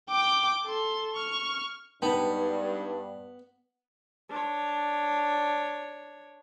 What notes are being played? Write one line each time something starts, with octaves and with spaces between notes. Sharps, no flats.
G5 D6
A4 C6
C#6 F6
G2 G#3 B3 D#4 G5 A5 B5
D4 C#5